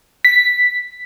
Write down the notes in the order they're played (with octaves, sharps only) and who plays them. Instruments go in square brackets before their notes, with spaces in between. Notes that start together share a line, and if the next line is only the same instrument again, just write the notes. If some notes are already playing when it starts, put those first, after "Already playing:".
[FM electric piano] B6